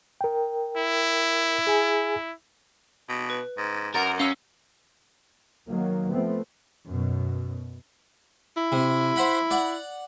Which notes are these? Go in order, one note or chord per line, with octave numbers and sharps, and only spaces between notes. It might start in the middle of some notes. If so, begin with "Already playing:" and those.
A#4 G5
E4
G#4 G#5
B2
B4
G#2
F#2 A#4 F#5 A6
C#4 F5 E6 A#6
D#3 F#3 A#3
F3 A3 B3 C4
F#2 B2
E4
C3
C5 F#5 B5
D5 F#5